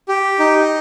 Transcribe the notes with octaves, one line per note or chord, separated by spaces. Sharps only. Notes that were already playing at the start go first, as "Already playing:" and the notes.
G4
D#4